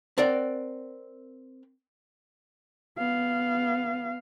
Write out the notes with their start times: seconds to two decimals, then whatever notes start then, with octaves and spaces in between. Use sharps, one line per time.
0.18 C4 A#4 D5 F#5 G5
2.98 B3 F5